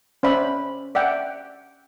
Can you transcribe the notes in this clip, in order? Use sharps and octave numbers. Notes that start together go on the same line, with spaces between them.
C#4 C5 D5 E5 B5
D5 E5 F#5 G5